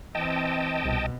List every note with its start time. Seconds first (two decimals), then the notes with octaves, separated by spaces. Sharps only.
0.15 E3 C4 D#5 G5 A5
0.85 C2 B2